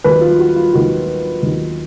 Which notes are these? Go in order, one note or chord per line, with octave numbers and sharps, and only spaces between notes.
D#2 D#3 F#3 B4
F4
F#4
F4
D#2 D#3 F#3 F#4
D#2 D#3 F#3